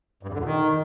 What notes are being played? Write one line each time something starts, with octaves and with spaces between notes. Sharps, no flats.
G2
E2
D3
A#2
D#3